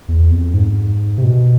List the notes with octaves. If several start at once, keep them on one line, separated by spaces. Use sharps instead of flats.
E2
F2
G#2
C3
B2